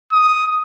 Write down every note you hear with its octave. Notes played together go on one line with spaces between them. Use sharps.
D#6